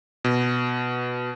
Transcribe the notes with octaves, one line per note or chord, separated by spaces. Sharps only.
B2